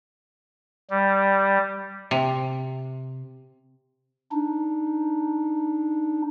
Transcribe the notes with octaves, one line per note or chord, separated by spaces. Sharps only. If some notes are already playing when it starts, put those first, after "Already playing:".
G3
C3
D4 D#4